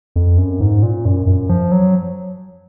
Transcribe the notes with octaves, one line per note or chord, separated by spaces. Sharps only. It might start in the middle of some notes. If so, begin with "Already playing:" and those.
F2
F#2
G#2
A#2
F#2
F#2
F3
F#3